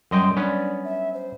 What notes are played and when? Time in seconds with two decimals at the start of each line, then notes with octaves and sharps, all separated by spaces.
0.11 F#2 F#3 G3 D#5 G5 C6
0.37 B3 C#4 D4 D5
0.84 E5
1.13 C5